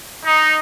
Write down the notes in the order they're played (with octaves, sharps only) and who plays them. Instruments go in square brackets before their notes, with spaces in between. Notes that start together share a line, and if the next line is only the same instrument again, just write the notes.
[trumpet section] D#4